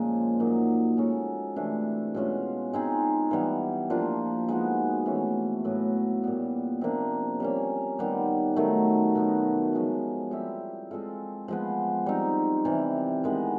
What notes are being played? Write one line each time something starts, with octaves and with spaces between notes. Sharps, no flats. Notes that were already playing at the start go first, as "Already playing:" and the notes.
Already playing: A#2 C#3 F3 G#3 A#3
A#2 F#3 A#3 D#4
G#3 C#4 F#4 A4
C3 E3 A3 D4
B2 G#3 C#4 F4
G#3 C4 D#4 G#4
E3 G3 B3
F3 A#3 D4 F4
G#3 B3 D#4 F#4
E3 A3 C#4
A2 F#3 B3
A#2 G3 B3
C3 F3 A#3 D4
G3 A#3 C#4
D#3 G3 B3
D#3 F#3 A3
B2 F#3 B3 D#4
F3 G#3 C#4
G3 C4 E4 G4
G#3 C4 F4 A4
F3 G#3 B3
G3 C4 D#4
C3 E3 G3
D#3 G#3 B3